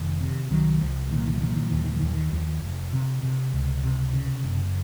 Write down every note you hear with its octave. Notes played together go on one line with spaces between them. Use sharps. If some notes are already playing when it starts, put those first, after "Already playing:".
Already playing: F1 D#3
C3
C2 D#3 F#3
C2 F3
A#2 D#3
F3
D#3
F3
A#2 D#3
F3
D#3
F3
D#2 D#3
F3
D#3
F3
D#3
D#2 F3
D#3
D#2 F3
F1
C3
C3
C#2
C3
C#3
F#1